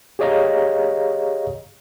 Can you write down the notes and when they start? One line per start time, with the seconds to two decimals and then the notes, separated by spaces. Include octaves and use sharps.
0.19 G4 G#4 C#5 D#5 F5 A#5